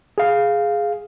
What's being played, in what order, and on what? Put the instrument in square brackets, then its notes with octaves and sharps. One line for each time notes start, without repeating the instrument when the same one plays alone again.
[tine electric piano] G#4 F5